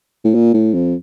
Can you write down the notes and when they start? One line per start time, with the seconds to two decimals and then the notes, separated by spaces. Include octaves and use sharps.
0.24 A2
0.35 A#2
0.54 A2
0.74 F2